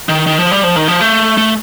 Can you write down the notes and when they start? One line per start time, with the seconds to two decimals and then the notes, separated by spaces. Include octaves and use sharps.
0.09 D#3
0.26 D#3
0.38 F3
0.52 G3
0.63 F3
0.76 D#3
0.88 F3
1.01 A3
1.37 A3